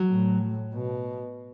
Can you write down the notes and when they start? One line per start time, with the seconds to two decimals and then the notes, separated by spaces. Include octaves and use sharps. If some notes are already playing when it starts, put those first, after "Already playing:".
Already playing: F#3
0.09 A2
0.74 B2